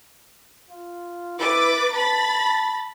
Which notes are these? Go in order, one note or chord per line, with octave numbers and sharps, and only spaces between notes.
F4
E4 B4 D6 A6
A5 B5 A6